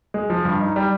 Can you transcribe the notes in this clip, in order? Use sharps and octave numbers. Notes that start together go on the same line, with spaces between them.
G#3
F3
G2
D#4
G3